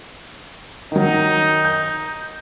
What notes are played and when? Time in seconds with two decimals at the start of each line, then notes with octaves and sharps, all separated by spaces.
0.92 D#3 F#3 D#4
1.65 G6